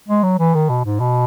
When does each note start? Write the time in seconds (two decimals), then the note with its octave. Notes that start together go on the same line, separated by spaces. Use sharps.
0.08 G#3
0.23 F#3
0.39 E3
0.54 D#3
0.69 B2
0.85 G#2
1.00 B2